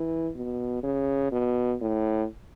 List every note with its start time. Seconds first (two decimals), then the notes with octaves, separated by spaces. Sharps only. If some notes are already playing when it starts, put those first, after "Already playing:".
Already playing: E3
0.35 B2
0.83 C#3
1.32 B2
1.81 A2